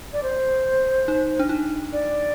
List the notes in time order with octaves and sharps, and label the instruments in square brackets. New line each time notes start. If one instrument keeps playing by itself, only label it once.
[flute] D5
C5
[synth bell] D#4
D4
D#4
[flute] D5